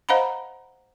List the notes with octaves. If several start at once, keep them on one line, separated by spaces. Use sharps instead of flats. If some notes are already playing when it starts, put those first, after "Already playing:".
C5 D#5 F5 F#5 A#5 B5